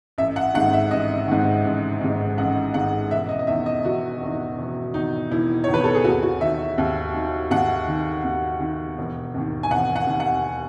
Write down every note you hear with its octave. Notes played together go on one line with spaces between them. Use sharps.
A1 E5
F#5
G#2 D#3 F#5
E5
A1 D#5
G#2 D#3
A1
G#2 D#3
A1 F#5
G#2 D#3 F#5
E1 E5
D#5
D#5
E2 D#3 E5
D#5
E1 F#4
E2 D#3
E1
E2 D#3 D#4
E1 E4
E2 D#3 C#5
B4
A4
G#4
D#2 F#4
F#4
D#3 E5
D#2
D#3
D#2 F#5
D#3
D#2
D#3
E1
D#2 D#3
G#5
E1 F#5
F#5
D#2 D#3
F#5